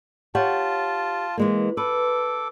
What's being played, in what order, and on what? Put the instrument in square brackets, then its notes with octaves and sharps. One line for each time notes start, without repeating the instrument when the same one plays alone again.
[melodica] F4 A5 [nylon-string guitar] G4 C#5 F#5
[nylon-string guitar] E3 G#3 A#3
[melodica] A4 D6 [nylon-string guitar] B4